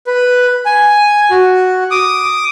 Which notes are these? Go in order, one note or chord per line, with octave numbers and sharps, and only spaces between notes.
B4
G#5
F#4
D6 D#6